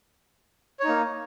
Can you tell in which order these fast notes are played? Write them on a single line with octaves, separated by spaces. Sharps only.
C#5 D#4 A#3